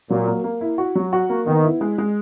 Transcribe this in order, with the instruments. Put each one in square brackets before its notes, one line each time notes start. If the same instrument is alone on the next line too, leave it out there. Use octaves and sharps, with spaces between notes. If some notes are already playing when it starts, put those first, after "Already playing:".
[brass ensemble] A#2 [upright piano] F#3
[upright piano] A#3
A#3
E4
F#4
F#3
F#4
A#3
[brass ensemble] D#3 [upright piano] B3
[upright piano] E4
G#3
G#3